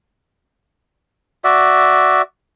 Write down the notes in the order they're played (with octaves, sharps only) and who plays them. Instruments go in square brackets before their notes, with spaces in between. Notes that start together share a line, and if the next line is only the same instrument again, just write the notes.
[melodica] F#4 D5 E5